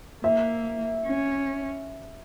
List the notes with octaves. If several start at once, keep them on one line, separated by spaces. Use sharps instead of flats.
A#3 E5
C#4